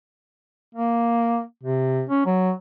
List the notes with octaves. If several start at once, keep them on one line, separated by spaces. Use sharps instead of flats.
A#3
C3
C#4
F#3